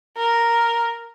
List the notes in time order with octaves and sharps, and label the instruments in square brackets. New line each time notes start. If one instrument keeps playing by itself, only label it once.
[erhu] A#4